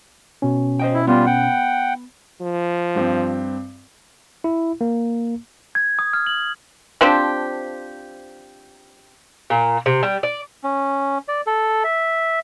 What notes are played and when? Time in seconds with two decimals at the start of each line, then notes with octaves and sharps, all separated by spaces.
0.42 B2 C#4
0.79 C5 D#5 G5
0.94 E4
1.07 G3 B3 F4
1.26 F#5 G5
2.42 F3
2.96 G2 C4
4.44 E4
4.81 A#3
5.75 G#6
5.99 D#6
6.13 F6
6.27 F#7
7.01 F3 C4 D4 G4
9.50 A#2
9.86 C3
10.03 G3
10.23 D5
10.64 C#4
11.28 D5
11.47 A4
11.84 E5